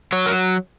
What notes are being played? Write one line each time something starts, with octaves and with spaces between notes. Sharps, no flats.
F#3 C#5
A#4